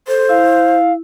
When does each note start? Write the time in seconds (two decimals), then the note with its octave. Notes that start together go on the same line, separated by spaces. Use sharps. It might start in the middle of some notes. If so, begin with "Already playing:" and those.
0.08 A4 C5
0.29 E4 F5